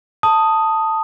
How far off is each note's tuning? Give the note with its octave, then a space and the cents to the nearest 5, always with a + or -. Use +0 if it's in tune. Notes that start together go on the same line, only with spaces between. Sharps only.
A5 +10 D#6 +0